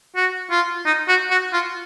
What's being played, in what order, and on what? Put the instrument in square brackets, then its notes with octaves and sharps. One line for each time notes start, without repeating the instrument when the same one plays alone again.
[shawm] F#4
F4
D#4
F#4
F#4
F4